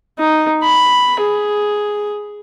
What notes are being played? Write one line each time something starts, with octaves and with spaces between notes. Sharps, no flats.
D#4
B5
G#4